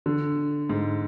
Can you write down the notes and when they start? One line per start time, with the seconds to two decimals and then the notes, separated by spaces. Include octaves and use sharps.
0.06 D3
0.69 G#2